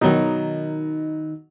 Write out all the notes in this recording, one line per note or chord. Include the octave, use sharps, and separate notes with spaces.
B2 D#3 F#3 D#4